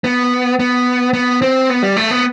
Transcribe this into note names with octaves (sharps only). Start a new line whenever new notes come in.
B3
B3
B3
C4
B3
G3
A3
B3